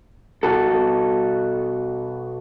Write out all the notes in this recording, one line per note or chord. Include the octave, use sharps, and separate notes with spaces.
B2 F#4 A4